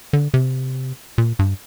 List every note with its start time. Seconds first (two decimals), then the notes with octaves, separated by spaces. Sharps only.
0.13 D3
0.34 C3
1.18 A#2
1.39 G2